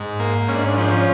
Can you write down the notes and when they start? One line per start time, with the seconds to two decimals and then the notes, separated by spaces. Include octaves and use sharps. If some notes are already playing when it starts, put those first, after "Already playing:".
Already playing: G#2
0.20 A#3
0.48 G#2 C#4
0.56 D4
0.63 C#4
0.69 D4
0.77 F3 C#4
0.84 D4
0.91 C#4